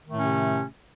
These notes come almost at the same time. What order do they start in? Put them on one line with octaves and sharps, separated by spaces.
D#3 A3 A2 C#4 C3